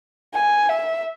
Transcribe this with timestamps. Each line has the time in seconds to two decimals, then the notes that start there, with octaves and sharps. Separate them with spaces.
0.34 G#5
0.69 E5